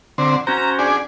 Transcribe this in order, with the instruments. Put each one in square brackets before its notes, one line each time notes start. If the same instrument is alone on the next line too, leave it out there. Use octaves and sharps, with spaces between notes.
[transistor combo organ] D3 C4
[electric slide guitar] C#4 F#4 C5 [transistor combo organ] A#5
[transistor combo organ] D4 G#4